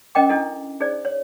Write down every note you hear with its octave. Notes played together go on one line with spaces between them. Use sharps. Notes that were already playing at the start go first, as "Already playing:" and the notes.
C#4 A#4 D#5 G5 D6
D4 E4 A4 D#5
D#4 G#4 C5 D5
C#5